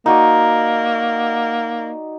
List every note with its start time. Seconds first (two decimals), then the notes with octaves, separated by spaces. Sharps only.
0.06 A#3 D#4 F#4 D5